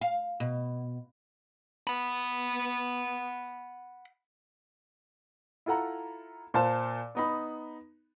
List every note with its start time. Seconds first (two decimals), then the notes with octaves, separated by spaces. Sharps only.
0.01 F5
0.40 B2
1.87 F#5 B5
5.66 E4 F4 A4 F#5 A#5
6.54 A#2 C5 F5 A5
7.15 B3 D#4 B5